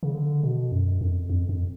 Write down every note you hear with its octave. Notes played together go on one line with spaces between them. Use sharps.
C#3
D3
B2
F#2
F2
F2
F2